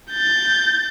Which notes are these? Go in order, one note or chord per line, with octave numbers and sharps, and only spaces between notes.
G6 A6